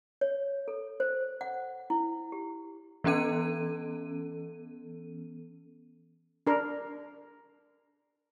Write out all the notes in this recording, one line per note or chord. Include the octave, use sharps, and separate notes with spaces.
C#5
A4
C5
F#5
E4
G4
E3 B3 C#4 A4 D#7
D4 A#4